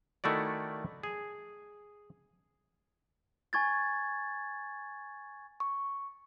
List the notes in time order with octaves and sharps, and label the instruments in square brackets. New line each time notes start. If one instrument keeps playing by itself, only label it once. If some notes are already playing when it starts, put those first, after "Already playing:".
[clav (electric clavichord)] D#3 A3 E4 F#4 D5
G#4
[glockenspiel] G#5 C#6 G#6 A6
[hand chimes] C#6